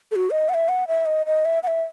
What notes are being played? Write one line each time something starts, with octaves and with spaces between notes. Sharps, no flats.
A4
F#4
D#5
F#5
E5
F#5
E5
D#5
D#5
E5
F#5
E5